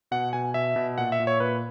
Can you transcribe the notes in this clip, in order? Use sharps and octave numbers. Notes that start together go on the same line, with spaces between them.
B2 F#5
B2 G#5
B2 E5
B2
A#2 F#5
E5
A#2
C#5
A#2 B4